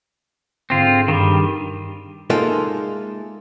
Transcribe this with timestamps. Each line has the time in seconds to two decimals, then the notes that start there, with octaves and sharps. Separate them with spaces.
0.70 G#2 D3 C4 F4 D6
1.08 G2 D#3 G3
2.30 G#3 A#3 D#4 F4 A4 E5